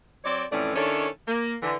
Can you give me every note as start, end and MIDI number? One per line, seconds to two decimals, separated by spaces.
0.24 0.44 54
0.24 0.44 60
0.24 0.44 73
0.24 0.44 74
0.52 0.75 41
0.52 0.75 45
0.52 0.75 52
0.52 0.75 57
0.52 0.75 61
0.52 0.75 74
0.76 1.08 51
0.76 1.08 61
0.76 1.08 62
0.76 1.08 64
0.76 1.08 69
0.76 1.08 73
1.28 1.55 58
1.62 1.76 50
1.62 1.76 52